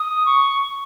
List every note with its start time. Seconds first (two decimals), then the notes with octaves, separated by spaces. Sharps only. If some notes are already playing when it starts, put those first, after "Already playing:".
Already playing: D#6
0.26 C#6